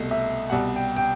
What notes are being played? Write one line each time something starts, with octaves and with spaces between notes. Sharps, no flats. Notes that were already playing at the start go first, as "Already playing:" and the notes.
Already playing: C2 B2 A3 D#5
E5
C2 B2 G3 F#5
G5
G5